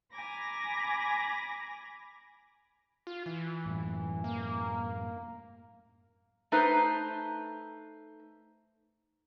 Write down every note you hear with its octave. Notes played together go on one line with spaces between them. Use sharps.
G#5 A#5 B5 D6 G#6 A#6
F4
E3
F#2 A2
A#3
A3 D#4 B4 C5